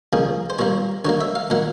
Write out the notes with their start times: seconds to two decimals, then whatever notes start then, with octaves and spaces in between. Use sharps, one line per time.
0.13 C#3 F3 A#3 G#4
0.50 C5
0.59 A#2 G3 A#3 C#5
1.05 D3 F#3 A#3 C#5
1.21 E5
1.35 F5
1.50 A#2 F#3 A#3 F#5